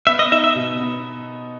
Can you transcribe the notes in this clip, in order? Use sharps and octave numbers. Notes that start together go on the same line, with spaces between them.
B3 E5
D#5
D#4 E5
E5
B2
B3